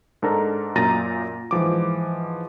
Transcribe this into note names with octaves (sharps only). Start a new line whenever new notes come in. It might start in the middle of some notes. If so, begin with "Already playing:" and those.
G#2 D4 A4 A#4 A#5
F#2 A#2 A#5 A6 A#6 D#7
G#2 E3 F3 D6